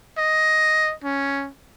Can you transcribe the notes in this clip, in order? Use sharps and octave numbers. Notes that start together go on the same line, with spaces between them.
D#5
C#4